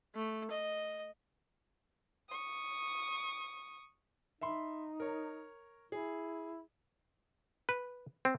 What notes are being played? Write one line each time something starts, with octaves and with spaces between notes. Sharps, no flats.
A3
D#5
C#6 D#6
D#4 E5 B5 C6
A#4 C#5
E4 G#4
B4
C4